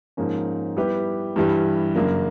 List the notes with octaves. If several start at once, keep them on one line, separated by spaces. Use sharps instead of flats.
G#2 F3 A#3 C#4
G3 B3 E4 G4 B4
G2 E3 G3
F#2 C#3 F#3 A#3 D4